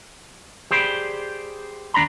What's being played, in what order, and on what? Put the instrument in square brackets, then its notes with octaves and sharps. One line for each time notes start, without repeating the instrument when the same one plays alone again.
[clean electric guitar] G4 G#4 C5 D5 B5
D#2 D4 D5 A#5 B5